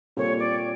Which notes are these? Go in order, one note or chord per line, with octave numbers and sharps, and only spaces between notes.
A#2 G3 C4 F4 A4 C#5
D5